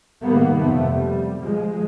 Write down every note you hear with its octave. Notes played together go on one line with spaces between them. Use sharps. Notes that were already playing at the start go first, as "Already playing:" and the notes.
G#2 C3 D#3 G3 A#3 B3
F2 C3 A3 B3
G3
F3 G#3